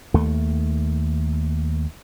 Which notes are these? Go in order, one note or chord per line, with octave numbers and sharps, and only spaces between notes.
D#2 A3